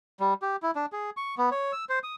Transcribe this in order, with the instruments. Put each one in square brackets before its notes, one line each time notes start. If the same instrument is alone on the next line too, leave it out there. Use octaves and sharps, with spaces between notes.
[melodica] G3
G4
E4
D4
G#4
C#6
B3
C#5
E6
C5
D#6